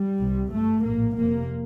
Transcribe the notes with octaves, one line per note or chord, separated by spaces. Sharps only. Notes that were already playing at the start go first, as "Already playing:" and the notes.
Already playing: G3
C2 C3
G1 G2 A3
A#1 A2 A#3
F1 F2 C3 A#3